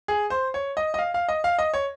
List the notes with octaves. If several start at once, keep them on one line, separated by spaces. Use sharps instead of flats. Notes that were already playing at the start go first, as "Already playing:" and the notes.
G#4
C5
C#5
D#5
D#5
F5
F5
D#5
F5
D#5
C#5